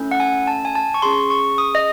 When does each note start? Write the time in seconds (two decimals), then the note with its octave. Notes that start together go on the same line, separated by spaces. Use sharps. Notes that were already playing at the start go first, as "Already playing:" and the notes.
Already playing: A3 C#4 E4 A4
0.11 F#5
0.20 G#5
0.47 A5
0.65 G#5
0.75 A5
0.94 C#6
1.02 C#4 G#4 C6
1.30 C#6
1.58 D#6
1.75 D#5